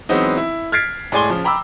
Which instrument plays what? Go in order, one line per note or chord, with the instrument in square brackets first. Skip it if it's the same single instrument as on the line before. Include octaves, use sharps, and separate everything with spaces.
[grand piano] E3 F#3 G#3 B3 C4 D#4
E4
F6 G#6 A6 B6 C7 D7
A2 G#3 D5 G#5 C6 G7
C#3 F3
G5 A#5 B5 D6 E6